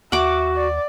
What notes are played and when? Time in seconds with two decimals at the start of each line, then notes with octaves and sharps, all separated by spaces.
0.12 D#2 F#4 E5 F#5 D6
0.56 D5